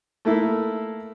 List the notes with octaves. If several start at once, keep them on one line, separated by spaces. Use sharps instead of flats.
A3 A#3 E4 A4